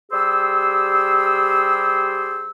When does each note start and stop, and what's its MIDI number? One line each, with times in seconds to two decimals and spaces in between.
0.12 2.51 55
0.12 2.51 67
0.12 2.51 68
0.12 2.51 72
0.12 2.51 88